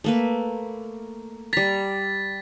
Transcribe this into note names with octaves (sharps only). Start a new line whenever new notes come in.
A3 A#3 B4
G3 A#5 A6 B6